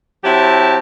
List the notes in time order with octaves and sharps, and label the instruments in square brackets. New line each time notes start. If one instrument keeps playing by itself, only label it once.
[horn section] F#3 C4 E4 G4 A5